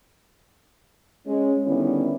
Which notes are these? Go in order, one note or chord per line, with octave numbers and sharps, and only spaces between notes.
G#3 C#4
D3 D#3 G3 B3 C#4 E4